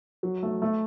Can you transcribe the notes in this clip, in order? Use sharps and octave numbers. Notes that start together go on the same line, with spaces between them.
F#3
A3
A3